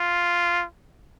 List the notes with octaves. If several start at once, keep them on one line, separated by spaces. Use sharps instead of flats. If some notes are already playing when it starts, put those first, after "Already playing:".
Already playing: F4